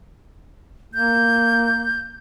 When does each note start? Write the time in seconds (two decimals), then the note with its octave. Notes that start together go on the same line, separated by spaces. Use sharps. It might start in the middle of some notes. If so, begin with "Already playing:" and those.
0.94 A#3 G6